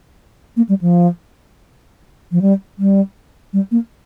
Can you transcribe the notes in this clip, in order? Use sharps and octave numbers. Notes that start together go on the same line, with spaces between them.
A#3
G3
F3
F3
G3
G3
G3
A#3